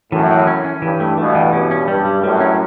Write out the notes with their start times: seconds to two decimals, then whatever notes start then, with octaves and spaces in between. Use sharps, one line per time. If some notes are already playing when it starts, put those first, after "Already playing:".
0.12 F#2 A2 E3
0.31 E3
0.47 C#4
0.64 C#4
0.82 G2 E3
1.00 A3
1.18 G2 B2 A3
1.35 E3
1.52 G2 B2 C#4
1.71 C#4
1.88 G2 G3
2.05 G3
2.23 F#2 A2 G3
2.40 C#4